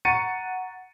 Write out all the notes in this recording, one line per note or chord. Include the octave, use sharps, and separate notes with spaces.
F#5 A#5 C#6 A6 C#7 D#7